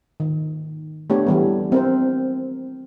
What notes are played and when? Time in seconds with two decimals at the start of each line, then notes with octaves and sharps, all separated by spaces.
0.20 D#3
1.10 A3 B3 D4 G4 C#5
1.27 E3 G3 B3
1.72 C4 A#4 C5